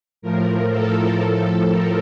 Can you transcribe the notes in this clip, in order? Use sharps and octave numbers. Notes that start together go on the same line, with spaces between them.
A2 F3 A#4
A4
A2 F3
A#4